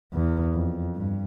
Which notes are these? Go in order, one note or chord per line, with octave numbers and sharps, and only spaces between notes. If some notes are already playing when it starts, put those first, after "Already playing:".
E2
F2
G2